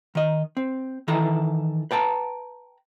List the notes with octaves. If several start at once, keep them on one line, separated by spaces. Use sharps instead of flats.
D#3 D#5
C4
D#3 E3 E4 A4 A#5
B4 G5 A5 A#5